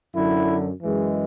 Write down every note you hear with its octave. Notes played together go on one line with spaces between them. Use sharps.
F#2 D3 F#3 E4
F#2 E3 G#3